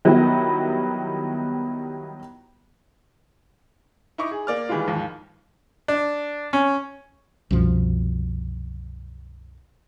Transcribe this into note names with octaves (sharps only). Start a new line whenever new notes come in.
D#3 F#3 G3 B3 E4
D#4 E4 C#6 D6
G#4
A#3 D5 F6
D#3 E3 G3 G#3 F4
D#2 G#2 F3
D4
C#4
C2 F#2 B2 F3